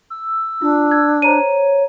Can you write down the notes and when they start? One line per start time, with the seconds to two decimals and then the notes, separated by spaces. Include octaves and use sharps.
0.10 E6
0.62 D4 F4
0.91 G#6
1.22 C5 C#5 A#5 D#7